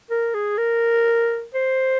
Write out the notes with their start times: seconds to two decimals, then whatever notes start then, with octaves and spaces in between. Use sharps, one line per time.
0.11 A#4
0.34 G#4
0.58 A#4
1.55 C5